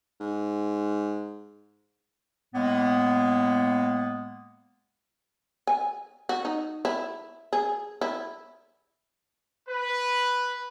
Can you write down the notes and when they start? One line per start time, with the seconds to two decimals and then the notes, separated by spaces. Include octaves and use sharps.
0.20 G#2
2.54 A2 G#3 A#3 B3
5.67 G#5
6.29 F#4
6.45 D#4
6.85 E4
7.53 G#4
8.01 E4
9.68 B4